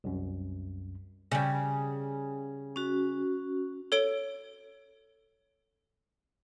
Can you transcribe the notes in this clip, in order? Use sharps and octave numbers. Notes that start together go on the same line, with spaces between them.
C2 F#2
C#3 G3
C#4 F#4
A4 C#5 D7 G7